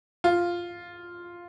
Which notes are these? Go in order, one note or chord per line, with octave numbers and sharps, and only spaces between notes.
F4